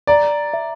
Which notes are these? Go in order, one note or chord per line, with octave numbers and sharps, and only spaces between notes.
D5 A#5
E5